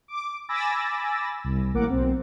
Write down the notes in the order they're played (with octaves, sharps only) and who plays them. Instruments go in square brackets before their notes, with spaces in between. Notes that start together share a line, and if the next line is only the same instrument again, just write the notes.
[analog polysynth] D6
G#5 B5 D6 E6 A6 A#6
C2
A1 A2 A#3 A#4 F#5 D6
B1 C4